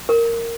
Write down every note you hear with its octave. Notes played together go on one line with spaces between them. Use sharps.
A#4